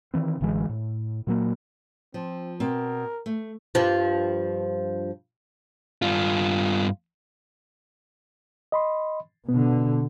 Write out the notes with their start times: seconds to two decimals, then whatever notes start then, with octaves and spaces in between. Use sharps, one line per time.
0.14 D#3 E3 C4
0.41 A1 D3 E3 G#3
0.69 A2
1.27 A#2 F#3 A#3
2.14 F3 C4
2.60 B2 C4 A#4
3.26 A3
3.75 G2 F3
6.02 G2 F4
8.72 D#5 B5 C6
9.49 B2 D3 B3